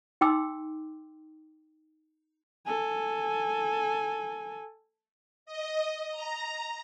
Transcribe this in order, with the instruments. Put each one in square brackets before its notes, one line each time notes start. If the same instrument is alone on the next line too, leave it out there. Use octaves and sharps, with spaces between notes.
[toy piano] D#4 G5 C6 D6 E6
[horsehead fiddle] A4 G#5
[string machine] D#5
A#5